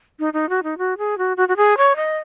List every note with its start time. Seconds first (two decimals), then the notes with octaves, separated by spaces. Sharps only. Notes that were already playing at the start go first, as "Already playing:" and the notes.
0.19 D#4
0.33 D#4
0.49 F#4
0.63 D#4
0.78 F#4
0.98 G#4
1.18 F#4
1.37 F#4
1.48 F#4
1.57 G#4
1.77 C#5
1.96 D#5